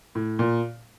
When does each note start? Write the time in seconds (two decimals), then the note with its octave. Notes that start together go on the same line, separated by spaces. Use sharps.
0.15 A2
0.39 A#2